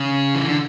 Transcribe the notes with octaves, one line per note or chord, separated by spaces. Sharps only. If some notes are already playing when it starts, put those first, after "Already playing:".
Already playing: C#3
E3
D3